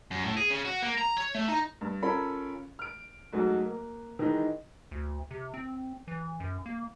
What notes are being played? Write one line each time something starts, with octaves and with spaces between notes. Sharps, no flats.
F#2
A2
G#4
C#3
F#4
A#3
A#5
C#5
A3
D#4
G2
C#4 F4 A4 A#4 C#5 B5
F6 D7
G#2 F#3 A3 F#4
A#3
D#3 E3 G#3 D#4
D2
C3
C4
E3
F#2
A#3